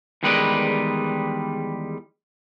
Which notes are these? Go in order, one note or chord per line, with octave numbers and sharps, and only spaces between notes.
E2 D#3 G3 G#3 B4 D5